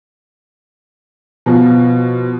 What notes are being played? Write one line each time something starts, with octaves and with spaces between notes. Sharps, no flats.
B2 F3